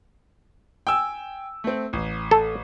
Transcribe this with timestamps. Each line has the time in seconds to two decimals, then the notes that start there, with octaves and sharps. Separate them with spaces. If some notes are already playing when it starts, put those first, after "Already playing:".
0.87 G5 G#5 E6
1.64 A3 C4
1.93 A1
2.31 A4